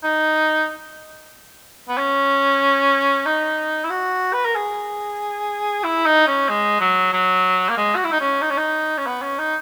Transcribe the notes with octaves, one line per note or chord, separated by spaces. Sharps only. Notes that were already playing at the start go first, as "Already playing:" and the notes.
D#4
B3
C#4
D#4
E4
F#4
B4
A#4
G#4
E4
D#4
C#4
G#3
F#3
F#3
A#3
G#3
F#4
E4
D#4
C#4
D#4
C#4
D#4
C#4
B3
C#4
D#4